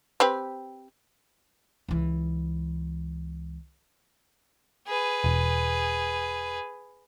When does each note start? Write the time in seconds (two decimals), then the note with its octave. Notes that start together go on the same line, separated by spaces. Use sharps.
0.20 C4 G4 B4
1.88 C#2 E3
4.88 G#4 B4
5.24 E1